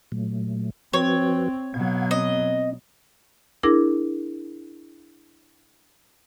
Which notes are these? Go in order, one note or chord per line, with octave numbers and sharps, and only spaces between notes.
A#2 F#3 A3
F3 C4 F#4 B4 C#5
B2 F#3 F5 F#5 G#6
C4 D#5
D4 E4 G#4 A#4 D6 A#6